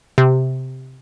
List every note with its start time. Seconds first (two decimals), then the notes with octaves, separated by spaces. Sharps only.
0.18 C3